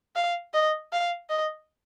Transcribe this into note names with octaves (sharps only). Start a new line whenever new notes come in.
F5
D#5
F5
D#5